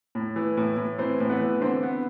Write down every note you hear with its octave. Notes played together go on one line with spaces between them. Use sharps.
A2
E3
A2
A2
E3 C4 C5
A2
B3 B4
E3
D3 C4 C5
B3